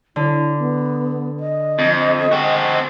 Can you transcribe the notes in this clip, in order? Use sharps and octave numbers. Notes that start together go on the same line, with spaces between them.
D3 E4
B3
D#5
F2
C4 F#4